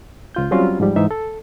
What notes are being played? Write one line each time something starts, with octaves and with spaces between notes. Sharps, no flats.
C#2 F4 G6
F#3 G3 C4 C#4 F4 F#4
G#2 F3 G3
G#2 E3 D#4 E5
A4